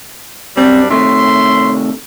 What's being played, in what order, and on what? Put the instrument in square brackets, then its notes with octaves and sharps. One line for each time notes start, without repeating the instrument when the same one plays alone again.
[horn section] F#2 G3 D4 [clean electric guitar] C4
[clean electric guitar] C3 D#3 A3 [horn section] C#5 E5 C6